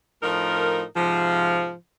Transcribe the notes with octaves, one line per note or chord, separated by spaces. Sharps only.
A2 F3 D#4 A#4
G#2 C3 F3